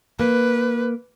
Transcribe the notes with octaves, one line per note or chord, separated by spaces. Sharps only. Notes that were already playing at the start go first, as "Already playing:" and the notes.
A#3 B4